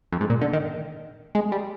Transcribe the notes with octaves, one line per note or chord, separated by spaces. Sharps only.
F2
G#2
A#2
D3
D#3
G#3
G3